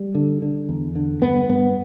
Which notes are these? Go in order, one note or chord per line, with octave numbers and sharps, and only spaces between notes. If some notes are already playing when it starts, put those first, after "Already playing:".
Already playing: G3
D3
D3
E2
D3
G2 B3
G2 B3